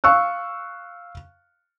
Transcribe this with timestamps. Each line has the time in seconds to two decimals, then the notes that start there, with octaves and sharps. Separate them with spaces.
0.04 F5 C#6 E6 F#6